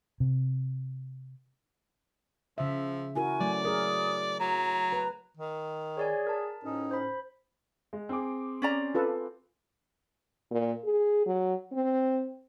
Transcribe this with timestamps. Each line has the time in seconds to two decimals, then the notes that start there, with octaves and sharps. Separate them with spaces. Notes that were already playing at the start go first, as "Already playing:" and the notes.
0.20 C3
2.58 C#3 F3 E5
3.16 E4 F#4 A#4 G#5
3.40 F#3 A3 D5
3.65 G#4 A#4 D#6
4.40 F#3 A#5
4.92 B4
5.37 D#3
5.97 G#4 C#5 D5 G#5
6.27 A#4 A5
6.64 D2 A2 C#4 D#4
6.91 C5 B5
7.93 G#3
8.09 C4 G#4 D6
8.62 C#4 D5 A#5
8.95 F4 A4 B4
10.51 A#2
10.84 G#4
11.26 F#3
11.73 C4